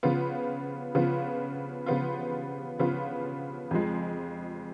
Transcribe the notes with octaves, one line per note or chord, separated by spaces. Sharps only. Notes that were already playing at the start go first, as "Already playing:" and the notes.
C#3 F3 B3 F4
C#3 F3 B3 F4
C#3 F3 B3 F4
C#3 F3 B3 F4
F2 F3 G#3